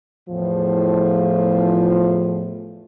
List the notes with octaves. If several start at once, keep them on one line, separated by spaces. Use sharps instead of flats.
E2 A2 F3